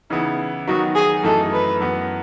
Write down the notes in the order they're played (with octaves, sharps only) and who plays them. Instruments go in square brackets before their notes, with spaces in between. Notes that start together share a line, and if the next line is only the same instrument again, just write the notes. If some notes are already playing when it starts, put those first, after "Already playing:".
[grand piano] C#3 E3 B3 E4 [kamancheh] D#4
[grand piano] D#3 F#3 B3 D#4 [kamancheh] F#4
[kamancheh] G#4
[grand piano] F#2 E3 A3 D#4 [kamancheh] A4
[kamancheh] B4
[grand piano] F#2 E3 B3